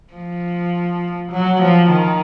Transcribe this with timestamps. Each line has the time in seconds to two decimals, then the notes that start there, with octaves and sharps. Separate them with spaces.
0.14 F3
1.32 F#3
1.61 F3
1.90 D#3